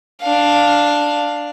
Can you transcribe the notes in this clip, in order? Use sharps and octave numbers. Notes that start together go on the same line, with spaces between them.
D4 F5